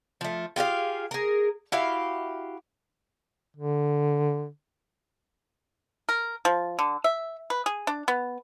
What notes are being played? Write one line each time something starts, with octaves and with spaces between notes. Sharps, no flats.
F3 A3
F4 G4 G#4 F5
G#4 A#4
E4 F#4 G4 F5
D3
A#4
F3
D3
E5
B4
G#4
D4
B3